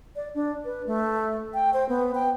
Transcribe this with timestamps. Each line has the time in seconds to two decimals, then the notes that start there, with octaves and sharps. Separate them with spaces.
0.16 D5
0.35 D4
0.65 B4
0.86 A3
1.54 G5
1.74 C5
1.89 B3
2.15 G5